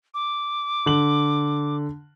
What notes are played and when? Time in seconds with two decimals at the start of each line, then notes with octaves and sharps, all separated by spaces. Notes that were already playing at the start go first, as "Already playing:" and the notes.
0.14 D6
0.86 D3 F#7